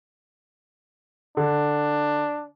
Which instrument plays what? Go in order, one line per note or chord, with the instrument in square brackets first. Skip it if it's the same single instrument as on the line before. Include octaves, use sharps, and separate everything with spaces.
[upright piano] D3 [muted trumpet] D4